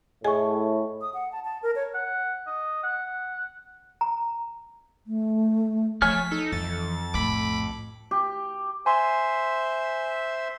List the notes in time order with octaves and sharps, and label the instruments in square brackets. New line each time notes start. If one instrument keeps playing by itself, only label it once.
[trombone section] A2 [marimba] G#4 G#5 [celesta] D#5 C#6
[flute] D#6
F#5
A5
A5
A#4
C#5
[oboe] F#5
D#5
F#5
[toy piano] A#5
[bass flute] A3
[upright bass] F3 [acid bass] A3 [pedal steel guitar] C#5 G#5 F6 [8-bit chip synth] B6
[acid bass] D#4 [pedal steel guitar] A4
[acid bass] F2 [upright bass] E3 [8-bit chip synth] A6
[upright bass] B1 A2 [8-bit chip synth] B5 D6
[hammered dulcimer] G4
[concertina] C5 E5 [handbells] G#5 C6